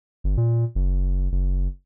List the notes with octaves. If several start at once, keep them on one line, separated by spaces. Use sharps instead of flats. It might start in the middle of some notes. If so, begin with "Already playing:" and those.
G1
A#2
F#1
F#1